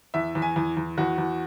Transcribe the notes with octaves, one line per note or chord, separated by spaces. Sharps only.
E2 E5
E2
G#5
E2
E2
E2 F#4
E2